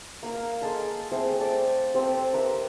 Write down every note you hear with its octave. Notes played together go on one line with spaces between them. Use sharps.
A#3 F5 A#5
G#4 A4 D#5 C6
A3 C4 G#4 C5
A4 D5
C4 G4
A#4 B4 E5 A#5